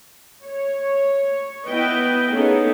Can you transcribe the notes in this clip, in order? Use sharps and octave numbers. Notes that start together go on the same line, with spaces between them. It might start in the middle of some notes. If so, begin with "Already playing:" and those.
C#5
B3 E4 B4 D#5 G5
A#3 B3 C#4 D#4 G#4 A4